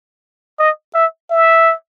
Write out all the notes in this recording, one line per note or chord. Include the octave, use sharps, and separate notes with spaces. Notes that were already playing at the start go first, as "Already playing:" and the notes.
D#5
E5
E5